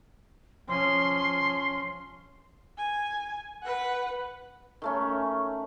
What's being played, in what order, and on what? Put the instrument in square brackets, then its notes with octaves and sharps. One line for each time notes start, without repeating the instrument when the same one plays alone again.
[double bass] F3 C#4 [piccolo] C6
[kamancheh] G#5
B4 F#5
[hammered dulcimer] D#3 A3 C#4